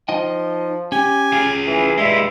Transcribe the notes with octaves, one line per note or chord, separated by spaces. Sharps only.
F3 D#4 D#5 G5
C#4 G4 G#5
F4 G#4
E3
G2 G#3 E4 E5